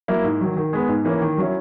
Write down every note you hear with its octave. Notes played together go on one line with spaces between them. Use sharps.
F#3 A#3 E4
G#2
D#3 F#3
D#3
G#3 B3
G#2
E3 A#3 C#4
D#3
F#3 C#4 E4